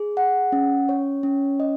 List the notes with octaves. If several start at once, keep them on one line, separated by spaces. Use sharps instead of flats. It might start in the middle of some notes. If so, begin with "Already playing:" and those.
Already playing: G#4
F#5
C#4
C#5
C#4
D#5